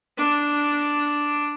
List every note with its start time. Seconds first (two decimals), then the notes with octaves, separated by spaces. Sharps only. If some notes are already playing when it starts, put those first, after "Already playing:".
0.18 D4